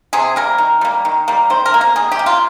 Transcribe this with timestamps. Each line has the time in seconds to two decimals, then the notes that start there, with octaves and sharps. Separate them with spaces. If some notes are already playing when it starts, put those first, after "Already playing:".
0.13 C3 G#4
0.36 G3 A#3 A#4
0.58 D#3
0.81 G3 A#3
1.05 D#3
1.28 G3 A#3
1.50 D#3 C5
1.66 A#4
1.74 A#3
1.81 A#4
1.96 D#3 G#4
2.12 G4
2.19 A#3
2.26 F4